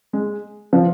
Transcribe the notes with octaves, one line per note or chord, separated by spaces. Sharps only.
G#3
F3